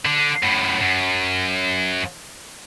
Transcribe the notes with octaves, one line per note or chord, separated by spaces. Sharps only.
D3
F#2 A2
F#2